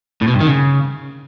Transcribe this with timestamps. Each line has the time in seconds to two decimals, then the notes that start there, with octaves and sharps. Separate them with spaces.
0.22 A2
0.28 B2
0.34 G2
0.40 D#3
0.47 C#3